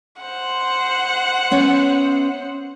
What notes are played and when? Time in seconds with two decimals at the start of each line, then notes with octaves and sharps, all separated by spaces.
0.22 C5 F#5
1.51 B3 C#4 E5